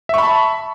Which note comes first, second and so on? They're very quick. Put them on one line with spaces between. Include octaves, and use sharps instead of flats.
E5 C#6 B5 A5